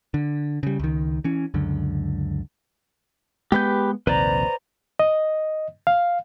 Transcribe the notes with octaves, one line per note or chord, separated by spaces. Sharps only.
D3
C#3 G3
C#2 D#3
E3 C#4
C#2 F#2 D3
G#3 B3 G4 B4 G6
A#1 D#2 C3 B4 C5 D5 A#5
D#5
F5